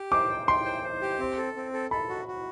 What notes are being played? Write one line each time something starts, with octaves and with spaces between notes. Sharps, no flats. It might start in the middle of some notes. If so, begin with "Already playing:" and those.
Already playing: G4
C5 D6
G5
G5 C6
C5
C5
G4
C4
A4
C4
A4
A4 B5
F#4
F#4